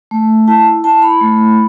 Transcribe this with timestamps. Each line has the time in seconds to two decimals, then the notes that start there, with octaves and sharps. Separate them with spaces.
0.11 A3
0.48 E4 A5
0.84 E4 A5
1.02 B5
1.21 A3